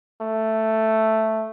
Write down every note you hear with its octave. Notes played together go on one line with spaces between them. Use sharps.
A3